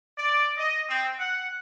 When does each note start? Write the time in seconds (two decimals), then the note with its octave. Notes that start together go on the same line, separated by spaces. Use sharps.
0.18 D5
0.57 D#5
0.89 C4
1.19 F#5